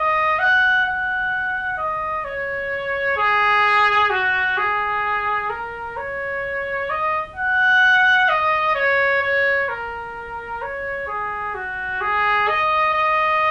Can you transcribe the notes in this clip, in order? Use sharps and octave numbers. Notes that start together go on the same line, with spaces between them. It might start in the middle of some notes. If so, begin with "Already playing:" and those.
Already playing: D#5
F#5
F#5
D#5
C#5
G#4
F#4
G#4
A#4
C#5
D#5
F#5
D#5
C#5
C#5
A#4
C#5
G#4
F#4
G#4
D#5
D#5